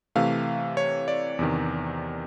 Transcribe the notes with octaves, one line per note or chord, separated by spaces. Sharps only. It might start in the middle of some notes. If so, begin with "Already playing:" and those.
C3 E3 A3 F5
C#5
D5
E2 C3 D#3